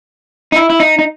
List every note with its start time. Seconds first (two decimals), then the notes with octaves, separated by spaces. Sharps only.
0.52 D#4
0.56 E4
0.70 E4
0.80 D#4
0.99 D#4